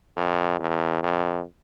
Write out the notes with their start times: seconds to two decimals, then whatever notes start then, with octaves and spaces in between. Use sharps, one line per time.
0.17 F2
0.60 E2
1.03 F2